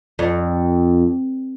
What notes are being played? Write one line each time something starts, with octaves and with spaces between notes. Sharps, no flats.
F2